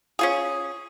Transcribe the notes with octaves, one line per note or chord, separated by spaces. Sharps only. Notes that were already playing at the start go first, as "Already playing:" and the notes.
C#4 F4 G#4